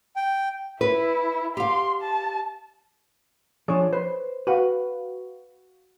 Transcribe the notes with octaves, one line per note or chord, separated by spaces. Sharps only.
G5
E4 B4
G4 F5 C6
A5
F3 D4 G#4 C#5
B4 C5
F#4 B4 F5 F#5